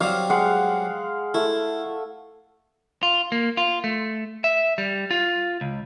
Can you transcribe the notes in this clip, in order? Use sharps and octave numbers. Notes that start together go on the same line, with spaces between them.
F#3 G3 C4 F5
G#3 F5 F#5
A3 E4
F4
A#3
F4
A3
E5
G3
F4
C#2